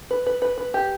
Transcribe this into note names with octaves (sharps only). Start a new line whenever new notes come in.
B4
B4
B4
B4
G4